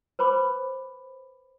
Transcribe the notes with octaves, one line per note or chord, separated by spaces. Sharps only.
B4 C5 B5 D6